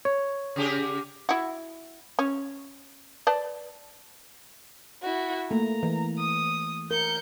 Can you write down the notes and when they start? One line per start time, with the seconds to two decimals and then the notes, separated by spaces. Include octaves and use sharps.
0.05 C#5
0.56 C#3 G4 G#4
1.29 E4 F#4
2.19 C#4
3.27 B4 D5 A5
5.02 E4 F#4
5.51 A3 A#3 A#5
5.83 E3
6.18 D#6
6.91 A#4 G6 C#7